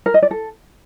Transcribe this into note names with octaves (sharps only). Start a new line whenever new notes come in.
A#4
D#5
D5
A4